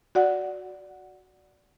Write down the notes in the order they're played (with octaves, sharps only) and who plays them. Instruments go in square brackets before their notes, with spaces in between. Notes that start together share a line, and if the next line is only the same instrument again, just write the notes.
[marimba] F#4 D5 F#5